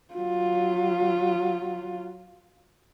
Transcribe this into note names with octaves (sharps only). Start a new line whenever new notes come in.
F#3 F4